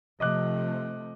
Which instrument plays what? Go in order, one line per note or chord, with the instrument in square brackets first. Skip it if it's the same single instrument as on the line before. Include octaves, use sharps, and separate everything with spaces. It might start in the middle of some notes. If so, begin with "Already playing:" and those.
[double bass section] C3 F3 A3 [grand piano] D#5 D6 F#6